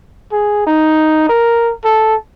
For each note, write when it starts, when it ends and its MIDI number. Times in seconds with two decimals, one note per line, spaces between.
0.32 0.62 68
0.67 1.24 63
1.29 1.72 70
1.84 2.15 69